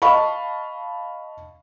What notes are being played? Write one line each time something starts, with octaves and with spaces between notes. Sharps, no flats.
D#5 F5 A5 B5 C#6